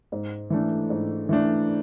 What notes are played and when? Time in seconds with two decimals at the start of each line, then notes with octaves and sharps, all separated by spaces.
0.12 G#2
0.50 E3 A3 D4
0.90 G#2
1.29 E3 A3 D4